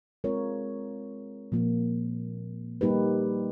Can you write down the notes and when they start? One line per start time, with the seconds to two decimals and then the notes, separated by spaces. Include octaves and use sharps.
0.24 G#3 C4 F4 A#4 C#5
1.52 A#2 F3 A#3
2.81 G3 A#3 D#4 G4 B4